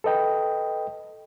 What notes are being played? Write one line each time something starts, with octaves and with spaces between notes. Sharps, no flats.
A4 B4 D#5 G5